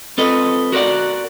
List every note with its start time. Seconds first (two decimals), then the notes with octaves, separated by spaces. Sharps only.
0.18 C4 F4 A4 B4 D#5
0.72 F#4 A#4 C#5 D5 F#5